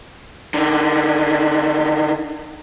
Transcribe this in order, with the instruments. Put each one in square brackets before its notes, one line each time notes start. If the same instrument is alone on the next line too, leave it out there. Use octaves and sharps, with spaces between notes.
[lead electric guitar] D3 D#3